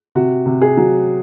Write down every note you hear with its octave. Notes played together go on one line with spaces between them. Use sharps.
C3 F#4
C3
G#4
F#3